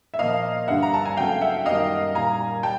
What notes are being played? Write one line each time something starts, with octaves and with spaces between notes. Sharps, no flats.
E5
A#2 F3 A#3 D#5 F5
G2 D3 G3 A#3 E5 F#5
A#5
A5
G#5
C#3 F#3 A3 F5 G5
E5 F#5
F#2 D#3 G3 A#3 D#5 F5
A#2 G3 A#3 G#5 A#5
G3 G5 A5